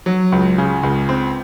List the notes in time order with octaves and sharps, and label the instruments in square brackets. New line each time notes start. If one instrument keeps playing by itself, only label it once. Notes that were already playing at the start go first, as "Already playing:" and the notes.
[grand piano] F#3
C#2
C#3
C#2
C4